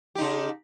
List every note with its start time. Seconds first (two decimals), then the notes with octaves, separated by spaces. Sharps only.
0.15 G4
0.18 D#4
0.21 C#3